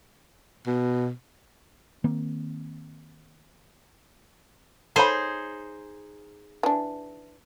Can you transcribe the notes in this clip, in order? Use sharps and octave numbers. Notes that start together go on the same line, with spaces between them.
B2
D#3 A#3 C4
D#4 G#4 A4 C5 C#5 B5
E3 D4